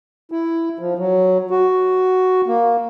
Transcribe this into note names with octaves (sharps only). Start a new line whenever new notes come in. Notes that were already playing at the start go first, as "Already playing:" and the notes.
E4
F3
F#3
F#4
A#3